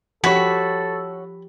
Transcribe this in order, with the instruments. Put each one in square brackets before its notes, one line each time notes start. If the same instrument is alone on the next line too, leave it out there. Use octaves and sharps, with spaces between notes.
[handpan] F3 G4 [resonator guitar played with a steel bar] F#4 C#5 [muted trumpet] A4 [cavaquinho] B5